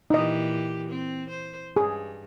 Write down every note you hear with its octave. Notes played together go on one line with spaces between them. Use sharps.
A#2 E3 D#4 G4 D#5
C4
C5
G2 G#4